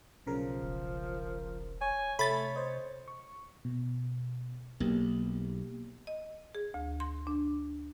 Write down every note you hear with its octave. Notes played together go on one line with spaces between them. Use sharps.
B1 C#3 F3 A#4
E1
C#5 G#5
C3 A3 C#5 B5 A6
C5 D#5
C#6
B2
B1 A#3 B3 G4
D#5
G#4
D2
C6
D4